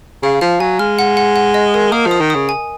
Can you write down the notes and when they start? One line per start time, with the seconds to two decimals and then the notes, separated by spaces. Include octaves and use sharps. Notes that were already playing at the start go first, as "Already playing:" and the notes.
0.23 C#3 F5
0.41 F3 F5
0.60 F#3 G#5
0.79 G#3 F6
0.99 F#5
1.17 F#5
1.36 F#5
1.54 D#5
1.74 A#4
1.92 A#3 D#6
2.07 F3 D#6
2.20 D#3
2.30 D#6
2.35 C#3
2.49 G#5